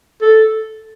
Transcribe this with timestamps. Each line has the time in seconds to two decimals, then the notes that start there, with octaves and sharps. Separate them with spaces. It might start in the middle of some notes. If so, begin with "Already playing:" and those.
0.22 A4